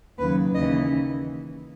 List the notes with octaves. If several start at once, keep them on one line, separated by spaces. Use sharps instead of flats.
D#2 C#3 F#3 B4
D#2 C#3 E3 D#5